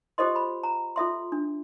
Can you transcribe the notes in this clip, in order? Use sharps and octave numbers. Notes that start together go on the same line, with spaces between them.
F4 G4 A4 C5 D#5 C6
B5
A#5
F4 A4 E5 C6
D4